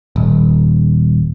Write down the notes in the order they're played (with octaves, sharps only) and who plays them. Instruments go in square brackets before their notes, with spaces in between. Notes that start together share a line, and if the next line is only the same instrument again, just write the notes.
[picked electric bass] D#1